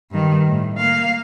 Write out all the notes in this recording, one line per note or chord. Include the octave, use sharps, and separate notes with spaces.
G2 D#3
A2
A#3 F5